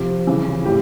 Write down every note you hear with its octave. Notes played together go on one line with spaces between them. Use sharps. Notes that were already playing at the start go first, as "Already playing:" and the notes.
Already playing: C3 F3
C#3 E3
A2 G4